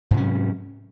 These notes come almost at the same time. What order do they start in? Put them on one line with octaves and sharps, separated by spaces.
G#2 C3 C#4 F#3